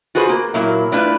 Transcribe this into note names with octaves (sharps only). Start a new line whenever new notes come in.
F4 F#4 G#4 B4 C5
A#3
A#2 F#3 A#3 E4
A3 D4 E4 F4 B4